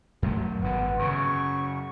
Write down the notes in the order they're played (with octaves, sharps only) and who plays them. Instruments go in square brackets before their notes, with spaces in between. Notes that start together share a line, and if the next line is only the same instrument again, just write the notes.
[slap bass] F#2 F#3 A3
[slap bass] G#1 G2 D3 [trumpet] B3
[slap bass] F#2 C#3 [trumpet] C#6